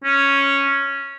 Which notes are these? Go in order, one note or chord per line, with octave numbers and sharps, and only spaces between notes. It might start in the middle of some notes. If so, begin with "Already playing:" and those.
C#4